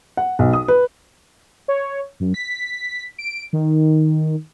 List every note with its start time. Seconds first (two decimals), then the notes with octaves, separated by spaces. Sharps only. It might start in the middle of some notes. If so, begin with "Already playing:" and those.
0.17 F#5
0.39 B1
0.53 D#6
0.68 B4
1.68 C#5
2.20 F#2
2.34 B6
3.19 D7
3.53 D#3